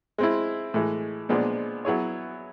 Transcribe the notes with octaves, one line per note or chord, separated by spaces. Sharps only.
G#3 C4 E4
A2 E3 G#3
A#2 F3 G#3 B3 D4
F#3 B3 E4 G#4 C#5